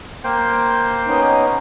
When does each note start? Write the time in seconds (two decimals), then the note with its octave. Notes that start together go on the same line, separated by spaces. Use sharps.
0.24 A#3 C5 G5
1.07 B3 C#4 D#4